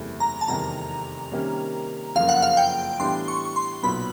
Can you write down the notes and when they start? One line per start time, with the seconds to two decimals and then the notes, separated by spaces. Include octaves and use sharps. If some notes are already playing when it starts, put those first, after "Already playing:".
Already playing: F#1 E2 C3 E3 A3
0.20 A#5
0.41 A5
0.48 F1 E2 C3 D#3 G3 A#5
1.32 C3 D#3 G3 A#3 C#4
2.16 F#1 F2 C#3 F3 A#3 F5
2.29 F#5
2.42 F5
2.57 G5
3.00 A2 E3 G3 B3 D4 C6
3.28 C#6
3.45 C#6
3.56 C6
3.83 B1 A#2 F#3 B3 B5